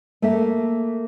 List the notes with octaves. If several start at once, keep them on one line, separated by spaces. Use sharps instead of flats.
A3 A#3 E5